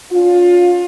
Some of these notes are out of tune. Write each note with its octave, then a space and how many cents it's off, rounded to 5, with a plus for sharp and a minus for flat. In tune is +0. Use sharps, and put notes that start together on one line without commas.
C#4 +35 F4 +25